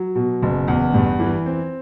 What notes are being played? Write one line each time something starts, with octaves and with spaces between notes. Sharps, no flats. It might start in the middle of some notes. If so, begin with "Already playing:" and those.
Already playing: F#3
B2
F#1
E2
G2
E3
C4